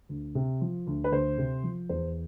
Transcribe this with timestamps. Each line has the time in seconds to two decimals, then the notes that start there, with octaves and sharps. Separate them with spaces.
0.09 D2
0.35 C3
0.61 F3
0.87 D2
1.04 B4
1.11 D2 C5
1.38 C3
1.63 F3
1.89 E2 C5